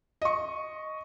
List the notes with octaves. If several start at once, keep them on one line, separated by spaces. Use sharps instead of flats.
D#5 C#6